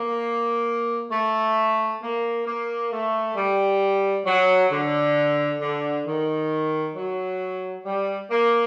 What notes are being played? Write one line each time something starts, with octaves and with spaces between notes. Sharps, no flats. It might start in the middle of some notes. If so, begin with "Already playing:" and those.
Already playing: A#3
A3
A#3
A#3
A3
G3
F#3
D3
D3
D#3
F#3
G3
A#3